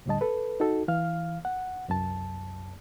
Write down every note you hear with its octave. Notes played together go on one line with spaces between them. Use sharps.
D2 A2 D3 G3 D#5 A5
A4 B4
D#4 F#4 A4
E3 F5 F6
F#5
C2 F#2 A5